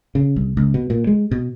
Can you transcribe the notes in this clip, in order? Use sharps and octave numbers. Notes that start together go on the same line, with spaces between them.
C#3
C2
C#2
B2
A#2
G#3
B2